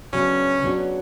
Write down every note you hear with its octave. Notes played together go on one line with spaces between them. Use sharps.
C#3 F#3 B3 C#4 D4 F#4
C#3 F#3 B3 D4 F#4